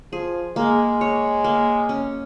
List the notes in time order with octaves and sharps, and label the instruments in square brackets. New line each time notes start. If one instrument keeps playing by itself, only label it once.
[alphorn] F3 [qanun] G#4
[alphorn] G#3 [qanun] A#3
[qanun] C#5
A#3
C#4